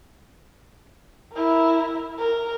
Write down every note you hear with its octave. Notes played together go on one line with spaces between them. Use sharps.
E4 A#4
A#4